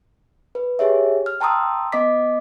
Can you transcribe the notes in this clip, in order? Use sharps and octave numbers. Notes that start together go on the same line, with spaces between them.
B4
G4 G#4 C#5 E5
F6
G5 A5 A#5 C6 D#6 E6
B3 D#5 D6 B6